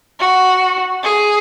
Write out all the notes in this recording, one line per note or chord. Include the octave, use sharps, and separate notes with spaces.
F#4
G#4